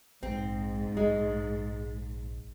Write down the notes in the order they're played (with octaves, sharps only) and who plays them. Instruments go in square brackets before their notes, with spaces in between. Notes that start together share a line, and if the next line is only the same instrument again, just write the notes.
[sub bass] A#1 [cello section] G#2 [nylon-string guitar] C4
[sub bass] A#1 [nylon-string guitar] G#3